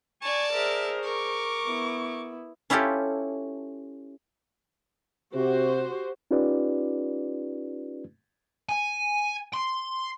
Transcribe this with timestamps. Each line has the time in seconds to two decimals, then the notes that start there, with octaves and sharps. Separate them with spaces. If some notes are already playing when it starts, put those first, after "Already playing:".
0.22 D5 G#5 A5 C#6
0.52 G#4 A#4 C5 E5
1.03 A#4 C#6 D6
1.66 B3 E4
2.70 C#4 E4 F4 G4 A4
5.35 C3 F#4 G4 C5
6.31 C#4 D#4 F4 G4 B4 D5
8.69 G#5
9.53 C6